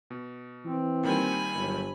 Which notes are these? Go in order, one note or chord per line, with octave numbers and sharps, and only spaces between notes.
B2
E3 C4
A#2 D#3 G3 G#5 B5
G1 F#3